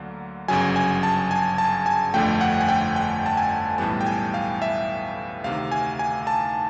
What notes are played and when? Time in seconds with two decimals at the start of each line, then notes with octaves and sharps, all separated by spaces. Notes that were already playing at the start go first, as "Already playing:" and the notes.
Already playing: D2 D3 F#3 A#3
0.48 G1 F#2 C#3 F#3 G#5
0.76 G#5
1.03 A5
1.31 G#5
1.58 A5
1.86 G#5
2.14 G1 F2 D3 F3 A3 G5
2.41 F#5
2.60 G#5
2.69 G5
2.96 G5
3.26 A5
3.37 G#5
3.78 B1 A2 E3 G3 B3 A5
4.01 G5
4.06 G#5
4.34 F5
4.62 E5
5.44 D2 C3 D#3 F5
5.72 G#5
5.99 G#5
6.27 A5